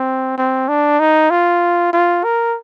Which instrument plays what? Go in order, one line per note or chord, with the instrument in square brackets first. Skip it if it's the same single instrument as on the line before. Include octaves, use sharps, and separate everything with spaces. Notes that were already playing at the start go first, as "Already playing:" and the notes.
Already playing: [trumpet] C4
C4
D4
D#4
F4
F4
A#4